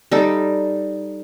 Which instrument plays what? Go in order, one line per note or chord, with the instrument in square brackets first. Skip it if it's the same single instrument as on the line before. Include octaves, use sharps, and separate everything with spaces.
[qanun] G3 D#4 A4